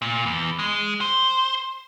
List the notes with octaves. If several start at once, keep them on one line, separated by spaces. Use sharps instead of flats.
A#2
E2
G#3
C5